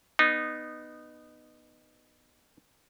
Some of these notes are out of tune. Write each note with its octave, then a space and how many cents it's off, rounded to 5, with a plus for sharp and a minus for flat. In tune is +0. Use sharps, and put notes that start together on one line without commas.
B3 +0 D#4 -20